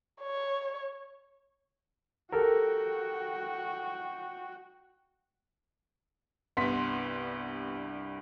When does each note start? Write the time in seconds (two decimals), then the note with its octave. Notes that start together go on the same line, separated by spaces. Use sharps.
0.21 C#5
2.32 F#4 G4 A4 A#4 G5
6.57 C2 G2 B3 C6 B6